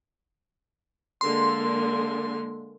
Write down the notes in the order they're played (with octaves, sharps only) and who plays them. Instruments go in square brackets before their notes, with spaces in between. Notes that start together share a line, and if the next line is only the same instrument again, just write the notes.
[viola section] D3 G#3 A#3 [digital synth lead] C6